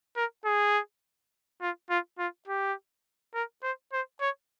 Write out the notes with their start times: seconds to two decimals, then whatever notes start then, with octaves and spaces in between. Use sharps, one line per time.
0.16 A#4
0.45 G#4
1.61 F4
1.90 F4
2.18 F4
2.48 G4
3.35 A#4
3.63 C5
3.93 C5
4.21 C#5